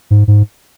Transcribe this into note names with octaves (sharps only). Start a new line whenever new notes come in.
G#2
G#2